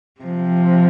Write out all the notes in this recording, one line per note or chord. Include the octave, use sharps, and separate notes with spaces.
C3 F3